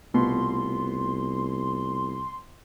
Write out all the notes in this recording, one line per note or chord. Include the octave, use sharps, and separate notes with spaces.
C2 B2 A3 B3 F4 C6